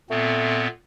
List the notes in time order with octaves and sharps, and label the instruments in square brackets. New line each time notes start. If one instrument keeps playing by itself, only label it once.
[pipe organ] A#2 B3 C4 [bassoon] A3